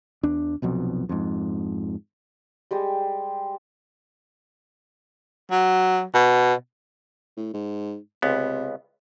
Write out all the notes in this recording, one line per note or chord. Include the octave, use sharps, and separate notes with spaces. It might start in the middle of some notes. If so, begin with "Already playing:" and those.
E2 D4
F1 B1 F2 B2
F2 G#2
G3 G#3 G4
F#3
B2
A2
G#2
C#2 C3 B3